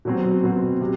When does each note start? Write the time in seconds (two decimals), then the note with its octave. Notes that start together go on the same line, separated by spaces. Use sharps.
0.05 B2 F#3 C4
0.43 B2 F#3 C4
0.81 C3